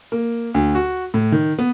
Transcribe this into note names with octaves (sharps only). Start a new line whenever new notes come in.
A#3
D2
F#4
A2
D#3
B3